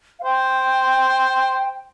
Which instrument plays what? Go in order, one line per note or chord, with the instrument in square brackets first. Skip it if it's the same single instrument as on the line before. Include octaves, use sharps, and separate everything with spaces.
[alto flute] F5
[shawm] C5 [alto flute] G5